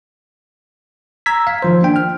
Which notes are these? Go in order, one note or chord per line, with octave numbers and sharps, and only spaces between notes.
A#5 E6 G#6 B6
F5
D#3 F3 C5
A#3 D4 G5
F6